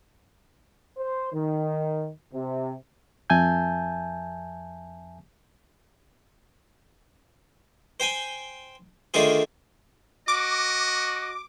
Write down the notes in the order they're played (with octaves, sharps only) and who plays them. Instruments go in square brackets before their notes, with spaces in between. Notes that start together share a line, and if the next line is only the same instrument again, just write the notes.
[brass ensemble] C5
D#3
C3
[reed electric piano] F2 E5 G#5 A5 G6
[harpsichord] C5 G5 G#5
D3 D#3 A3 F4 G#4 C5
[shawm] F#4 [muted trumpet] D#5 [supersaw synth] D6